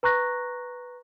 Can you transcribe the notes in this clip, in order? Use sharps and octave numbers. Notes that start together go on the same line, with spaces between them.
B4 A#5 C#6 F#6 A#6